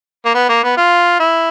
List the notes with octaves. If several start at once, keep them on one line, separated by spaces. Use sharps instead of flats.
A#3
B3
A#3
B3
F4
E4